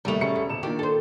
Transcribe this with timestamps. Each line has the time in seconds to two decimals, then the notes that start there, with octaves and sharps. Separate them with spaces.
0.05 F1 D#2 G3 A3 F7
0.21 E1 C#4 C#7
0.36 B2
0.49 D#1 E7
0.63 A#2 D#3 D4 G4
0.79 A4 C5